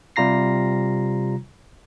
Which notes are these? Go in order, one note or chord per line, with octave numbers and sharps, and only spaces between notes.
C3 G3 F4 A#5 A#6 C7